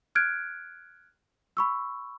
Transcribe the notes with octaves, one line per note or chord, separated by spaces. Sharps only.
F6 F#6 G#6 D7
B5 C#6 E6